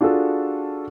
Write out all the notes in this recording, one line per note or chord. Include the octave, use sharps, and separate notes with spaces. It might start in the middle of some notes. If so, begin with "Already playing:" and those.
D4 F4 F#4 G#4 A4